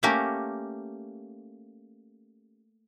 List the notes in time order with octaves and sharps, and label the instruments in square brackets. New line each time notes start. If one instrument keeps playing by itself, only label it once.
[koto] A3 A#3 C#4 G4 A#4